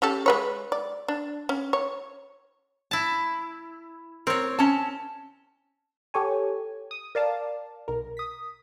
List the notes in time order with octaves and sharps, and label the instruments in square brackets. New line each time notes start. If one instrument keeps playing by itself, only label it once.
[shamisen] C#4 G4 A4
G#3 B4 C#5
D5
D4
C#4
C#5
[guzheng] E4 A5
[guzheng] C4 C#5 [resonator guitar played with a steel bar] A#4
[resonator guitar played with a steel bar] C#4 A5
[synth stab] G4 A4 C#5 G#5
D#6
A#4 D5 F5 A5
B1 A#4
D#6 B6